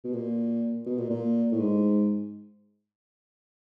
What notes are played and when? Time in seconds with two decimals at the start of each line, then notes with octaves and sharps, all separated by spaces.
0.04 B2
0.13 A#2
0.86 B2
0.98 A#2
1.10 A#2
1.52 A2
1.59 G#2